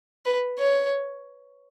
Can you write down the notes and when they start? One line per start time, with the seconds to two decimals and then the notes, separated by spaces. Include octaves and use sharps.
0.26 B4
0.59 C#5